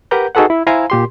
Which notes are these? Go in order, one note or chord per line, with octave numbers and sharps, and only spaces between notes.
G4 A#4 B4 F#5 A#5 G6
D#4 F#4 G#4 A4 B4 F#5
E4
E4 C5 F5 G#5 A#5
A#2 G4 C6